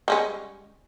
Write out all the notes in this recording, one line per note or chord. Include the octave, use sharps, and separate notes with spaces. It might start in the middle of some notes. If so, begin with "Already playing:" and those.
G3 G#3 C#4